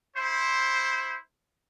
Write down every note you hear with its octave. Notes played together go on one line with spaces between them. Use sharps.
E4 C5